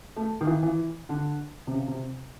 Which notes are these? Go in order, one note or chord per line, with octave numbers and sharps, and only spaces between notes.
A3
D#3
E3
E3
D3
C3
C#3
C3